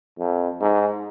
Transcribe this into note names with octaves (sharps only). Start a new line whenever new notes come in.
F2
G#2